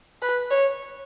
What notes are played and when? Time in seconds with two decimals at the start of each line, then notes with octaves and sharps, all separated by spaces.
0.22 B4
0.50 C#5